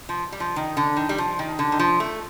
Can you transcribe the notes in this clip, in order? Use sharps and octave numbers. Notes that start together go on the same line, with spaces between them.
F3
G3
F3
D#3
D3
D#3
G3
F3
D#3
D3
D#3
F3
A3